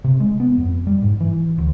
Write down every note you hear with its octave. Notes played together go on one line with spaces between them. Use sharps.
C3
G#3
B3
F2
G3
G#2
E3
D2